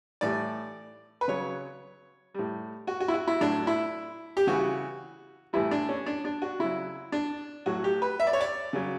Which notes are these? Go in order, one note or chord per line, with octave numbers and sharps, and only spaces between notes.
A2 E3 G3 D5
B4
C#3 F#3 C#5
A2 G3
F#4
F#4
E4
F#4
E4
A2 F#3 D4
E4
G4
C#3 E3 G3 F#4
A2 E3 G3 E4
D4
C#4
D4
D4
F#4
C#3 F#3 E4
D4
A2 F#3 F#4
G4
B4
E5
D5
C#5
D5
C#3 F#3